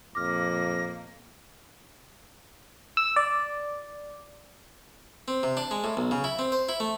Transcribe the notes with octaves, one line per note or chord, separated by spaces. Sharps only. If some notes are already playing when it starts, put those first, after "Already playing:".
F2 A#2 A#3 D6 F6 A#6
E6
D5
C4
C3
D4
G#3
A2
B1
C#3
E4
C4
C5
E4
A3